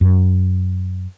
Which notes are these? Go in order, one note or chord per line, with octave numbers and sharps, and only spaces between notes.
F#2